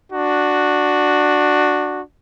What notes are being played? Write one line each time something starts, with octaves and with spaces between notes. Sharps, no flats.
D4 F#4